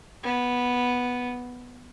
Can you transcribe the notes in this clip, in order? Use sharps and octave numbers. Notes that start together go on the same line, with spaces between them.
B3